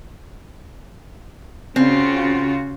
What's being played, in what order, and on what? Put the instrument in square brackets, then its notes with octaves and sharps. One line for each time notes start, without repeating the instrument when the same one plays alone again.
[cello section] C#3 F4 F#4 [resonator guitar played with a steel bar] C4